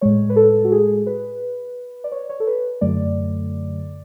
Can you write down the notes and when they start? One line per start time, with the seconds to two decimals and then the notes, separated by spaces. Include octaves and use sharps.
0.01 A2 G#3 C#5
0.30 B4
0.36 A4
0.64 F#4
0.72 G#4
1.07 B4
2.04 D5
2.12 C#5
2.30 C#5
2.40 A4
2.47 B4
2.81 F#2 D3 F#3 A3 D5